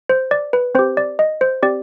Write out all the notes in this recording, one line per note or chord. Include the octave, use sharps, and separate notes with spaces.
C5
D5
B4
C4 G4 C5
D5
D#5
C5
C4 G4 D5